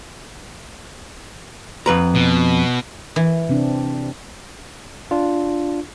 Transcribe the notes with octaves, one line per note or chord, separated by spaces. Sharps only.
F2 B4 A#5
B2
E3
C3 C4 D4
D4 F4